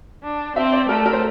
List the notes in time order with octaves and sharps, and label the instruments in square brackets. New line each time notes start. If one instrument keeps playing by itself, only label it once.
[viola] D4
[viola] C4 [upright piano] E5
[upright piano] D5
[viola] A3 [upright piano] A#4
[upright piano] A4
A#4
C5